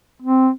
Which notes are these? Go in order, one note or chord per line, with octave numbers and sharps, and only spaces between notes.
C4